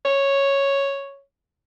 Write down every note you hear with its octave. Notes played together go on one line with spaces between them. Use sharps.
C#5